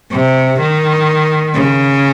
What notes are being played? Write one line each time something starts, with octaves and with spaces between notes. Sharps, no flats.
C3
D#3
C#3